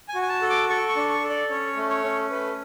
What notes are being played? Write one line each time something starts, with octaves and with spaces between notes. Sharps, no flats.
G#5
F#4
G#5
A5
A4
D6
A4 C#6
C#6
D4
C#6
A4
D5
C#4 C#5
A3
C#5
C#4
A3 B4